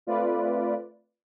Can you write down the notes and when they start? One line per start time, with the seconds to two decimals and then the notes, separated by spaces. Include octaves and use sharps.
0.07 A3 C4 F4 B4 D5